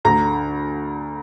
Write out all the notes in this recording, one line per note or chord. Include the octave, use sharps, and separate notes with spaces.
D2 D3 A#5